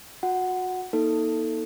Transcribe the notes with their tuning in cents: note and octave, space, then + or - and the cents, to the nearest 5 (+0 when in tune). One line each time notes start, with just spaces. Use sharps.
F#4 -30 F#5 +0
A#3 +40 D#4 +30 A4 +10